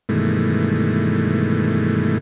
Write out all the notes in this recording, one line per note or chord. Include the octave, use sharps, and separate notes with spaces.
G2 B2 D#3 E3 G#3 A3